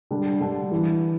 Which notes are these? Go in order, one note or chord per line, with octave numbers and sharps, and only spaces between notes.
D3 G3 D4
D3 G3 D4
E3